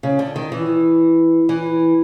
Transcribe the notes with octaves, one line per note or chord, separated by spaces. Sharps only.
C#3
D3
D#3
E3
E3